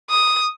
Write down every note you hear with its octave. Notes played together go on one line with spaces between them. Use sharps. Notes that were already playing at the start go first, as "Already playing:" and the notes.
D#6